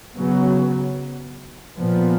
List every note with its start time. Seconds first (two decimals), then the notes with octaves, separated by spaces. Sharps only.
0.15 C#3 F#3 B3
1.77 A#2 F3 B3